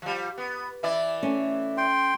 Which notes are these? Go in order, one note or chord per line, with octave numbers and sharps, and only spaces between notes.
F3 G3
B3
E3 E4 D5
A3 C#4
G5 C6